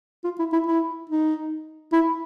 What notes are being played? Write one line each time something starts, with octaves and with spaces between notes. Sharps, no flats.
F4
E4
E4
E4
D#4
E4